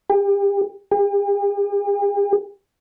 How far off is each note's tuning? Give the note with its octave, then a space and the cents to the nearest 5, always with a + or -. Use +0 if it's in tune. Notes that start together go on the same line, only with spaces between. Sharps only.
G4 +35
G4 +45